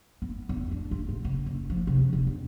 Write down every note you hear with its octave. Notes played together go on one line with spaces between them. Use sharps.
B3
E2
D4
F4
G#2
C#3
F#1
F3
C3
C#4
E1
E1